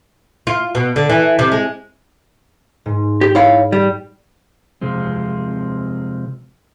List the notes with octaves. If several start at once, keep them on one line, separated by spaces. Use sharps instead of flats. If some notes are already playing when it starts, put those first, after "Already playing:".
F4
B2
D3
E3
C3
G#3
G#2
G4
E4 C#5 F5
G3
C3 F3 G#3 C4